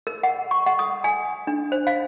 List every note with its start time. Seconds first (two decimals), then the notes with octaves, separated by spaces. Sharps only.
0.07 A#4
0.23 F#5
0.51 C#6
0.66 F#5
0.79 D#6
1.04 G#5
1.47 D4
1.72 C5
1.87 F5